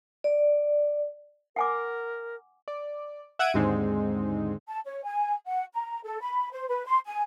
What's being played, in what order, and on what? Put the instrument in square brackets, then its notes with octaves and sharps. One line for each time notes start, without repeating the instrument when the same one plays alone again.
[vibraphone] D5
[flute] A#4 [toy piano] F#5 G#5 D6
[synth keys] D5
E5 F#5 E6 G#6 D7 D#7
D#2 G#2 D3 G#3 C4 D#4
[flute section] A5
C#5
G#5
F#5
A#5
A4
B5
C5
B4
C6
G#5